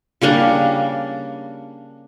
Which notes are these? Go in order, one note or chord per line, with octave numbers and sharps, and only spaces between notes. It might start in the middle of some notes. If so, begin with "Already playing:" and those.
C#3 G3 A#3 D4